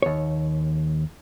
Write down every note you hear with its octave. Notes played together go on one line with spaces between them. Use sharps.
D#2 C#5